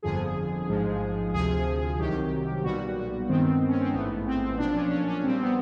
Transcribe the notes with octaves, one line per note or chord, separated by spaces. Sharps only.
G1 F2 D3 F3 G#4
A1 G#2 F3 G#3
D2 C3 F3 G#4
C2 C3 D#3 F#3 G4
B1 A#2 G3 B3 F#4
G2 D#3 G#3 B3 C4
C#4
C4
A1 G#2 E3 A3 B3
C4
B1 A#2 F3 D4
C#4
C#4
C#4
A#1 A#2 G3 C4
B3